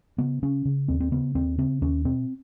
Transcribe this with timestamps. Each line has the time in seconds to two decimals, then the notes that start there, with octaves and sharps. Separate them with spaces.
0.18 C#3 B3
0.42 C#3 C#4
0.65 C#3
0.88 D#2 C4
1.00 C4
1.12 C#3 B3
1.35 D#2 C4
1.58 C#3 C4
1.82 D#2 C#4
2.05 B2 C4